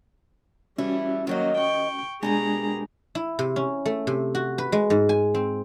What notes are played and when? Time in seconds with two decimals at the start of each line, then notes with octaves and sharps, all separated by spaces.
0.78 E3 G3 A3 C#4 E4 F#4
1.27 D#3 F3 F#3 A#3 D#5
1.58 G5 C#6
2.23 B2 G#3 D4 G4 G#4 A#4 G#5 A#5
3.15 E4
3.39 C3
3.56 C#4
3.86 A3
4.07 C3
4.35 F#4
4.58 B4
4.72 G#3
4.90 G#2
5.09 G#5
5.34 C4